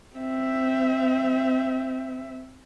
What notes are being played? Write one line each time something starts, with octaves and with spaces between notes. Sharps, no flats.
C4 E5